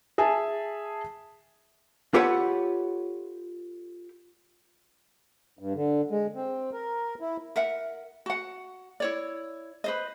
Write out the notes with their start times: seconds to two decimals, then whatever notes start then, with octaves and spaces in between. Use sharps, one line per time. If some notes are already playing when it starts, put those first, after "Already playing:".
0.18 G#4 E5 G#5 A5
2.14 F4 G4 A4 B4 C#5 F#5
5.59 G2
5.75 D3
6.11 G#3
6.35 C4
6.73 A#4
7.21 E4
7.56 A#4 E5 F#5
8.26 F#4 F#5
9.00 E4 C#5 D5
9.84 B4 C5 D#5